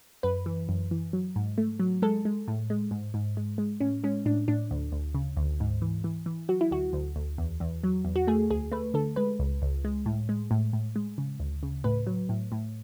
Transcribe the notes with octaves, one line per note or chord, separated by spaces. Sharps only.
F#2 B4
E3
F#2
E3
F#3
G#2
A3
F#3
G#3 A4
G#3
A2
G#3
G#2
G#2
G#3
G#3
A2 C#4
G#3 C#4
A2 D4
A2 D4
D2
D2
C#3
D2
G#2
E3
E3
E3
F#3 F#4
E4
D2 F#4
D2
D2
E2
E2
F#3
E2
F#4
A3 G#4
D2 G#4
A3 B4
D3 A4
G#3 B4
C#2
C#2
G#3
A2
G#3
A2
A2
G#3
C#3
D2
C#3
A2 B4
F#3
A2
A2